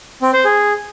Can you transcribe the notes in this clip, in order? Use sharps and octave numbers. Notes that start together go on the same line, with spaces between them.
C4
C5
G#4